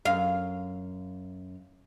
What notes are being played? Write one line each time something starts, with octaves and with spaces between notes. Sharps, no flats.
F#2 F5